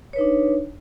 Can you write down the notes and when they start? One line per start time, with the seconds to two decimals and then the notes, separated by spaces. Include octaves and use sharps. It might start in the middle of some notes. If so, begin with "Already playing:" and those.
0.13 C#5
0.16 B4
0.18 D#4
0.21 D4